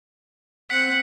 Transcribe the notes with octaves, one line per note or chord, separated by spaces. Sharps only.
C4 F#5 B6 C#7